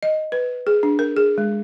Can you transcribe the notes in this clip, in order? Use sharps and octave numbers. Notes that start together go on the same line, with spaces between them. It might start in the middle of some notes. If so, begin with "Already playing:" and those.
D#5
B4
G#4
D4
A#4
G#4
G#3